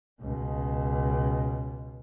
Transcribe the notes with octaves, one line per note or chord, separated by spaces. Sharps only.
C#2 B2